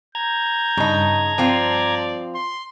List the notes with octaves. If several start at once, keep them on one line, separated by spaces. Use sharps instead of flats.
A#5 G6 G#6
G2 C#3 D#4 A5
F3 C4 F4 D5
C6